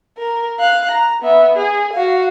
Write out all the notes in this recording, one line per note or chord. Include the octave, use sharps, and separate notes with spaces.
A#4
F5 F#6
A#5
B3 E5
G#4
F#4 F5